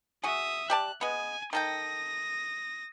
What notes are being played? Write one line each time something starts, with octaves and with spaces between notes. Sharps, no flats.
F#4 G#4 E5 D#6
G4 D5 A5 F#6
G#3 B3 G#5
D#3 A4 G5 D#6 A#6